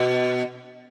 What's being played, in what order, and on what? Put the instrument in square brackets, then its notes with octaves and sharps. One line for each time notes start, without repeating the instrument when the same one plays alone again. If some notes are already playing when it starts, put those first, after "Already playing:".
Already playing: [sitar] B2